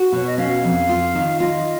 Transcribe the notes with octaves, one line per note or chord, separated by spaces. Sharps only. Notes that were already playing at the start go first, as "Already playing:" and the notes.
Already playing: F#4
B2 C#5
D#5
C#4 F5
F2
F4
D#3
F4 D#5